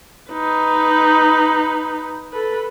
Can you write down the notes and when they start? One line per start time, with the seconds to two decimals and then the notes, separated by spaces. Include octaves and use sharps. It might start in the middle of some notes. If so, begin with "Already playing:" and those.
0.30 D#4 B4
2.33 A4 B4